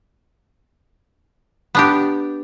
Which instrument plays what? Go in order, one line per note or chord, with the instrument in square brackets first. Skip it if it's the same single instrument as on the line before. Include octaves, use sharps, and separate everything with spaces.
[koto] B3 D4 G4